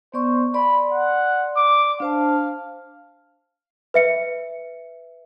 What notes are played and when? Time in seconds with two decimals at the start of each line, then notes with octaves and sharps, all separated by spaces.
0.14 B3 C5 D5 C#6
0.54 D5 B5 C6
0.92 F#5
1.57 D6
2.00 D4 C5 F5 A5
3.94 B4 E5 C#7